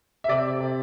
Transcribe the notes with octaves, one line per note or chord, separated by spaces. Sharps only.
E5
C3 D5
C3